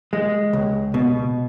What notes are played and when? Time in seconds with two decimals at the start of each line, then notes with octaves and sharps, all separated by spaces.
0.13 G#3
0.53 C#2
0.94 B2